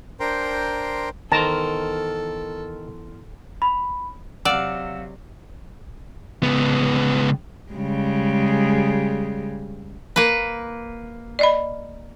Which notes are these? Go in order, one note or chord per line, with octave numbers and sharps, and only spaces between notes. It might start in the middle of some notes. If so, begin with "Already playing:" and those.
D4 A#4 C5 G5 A#5 C6
E2 D#3 A4 A#4 C5 A5 A#5
B5
C3 F#3 D5 F5 F#5 E6 E7
C#2 B3
C#3 G3 G#3
A#3 B4
D5 D#5 B5